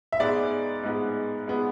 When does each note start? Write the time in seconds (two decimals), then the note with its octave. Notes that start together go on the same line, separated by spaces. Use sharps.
0.12 E5
0.20 G#2 G#3 B3 D5
0.83 G#2 G#3 B3
1.48 G#3 B3